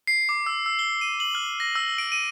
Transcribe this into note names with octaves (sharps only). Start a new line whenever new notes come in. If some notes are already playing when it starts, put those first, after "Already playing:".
C7
D6
E6
E6
G7
D#7
F#7
F6
A#6
E6
D7
D#7